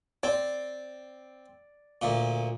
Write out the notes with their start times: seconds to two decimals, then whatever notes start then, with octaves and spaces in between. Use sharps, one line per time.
0.23 C4 D5
2.02 D2 A#2